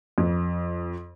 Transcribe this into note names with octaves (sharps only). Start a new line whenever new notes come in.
F2